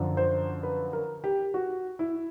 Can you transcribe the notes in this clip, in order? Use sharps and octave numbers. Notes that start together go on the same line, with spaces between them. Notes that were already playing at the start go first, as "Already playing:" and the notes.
Already playing: F#2 D3 F3
C5
B4
A#4
G4
F#4
E4